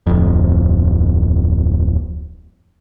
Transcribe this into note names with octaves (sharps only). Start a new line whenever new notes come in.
D1 F2